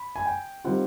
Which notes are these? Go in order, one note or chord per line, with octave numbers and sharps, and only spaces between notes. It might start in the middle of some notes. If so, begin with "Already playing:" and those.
Already playing: B5
G#5
G5
D#3 G3 C4 F4 F#5